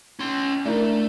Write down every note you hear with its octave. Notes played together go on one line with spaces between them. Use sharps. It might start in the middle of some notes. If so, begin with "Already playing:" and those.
C#4 C6
A3 D4 E4 A#4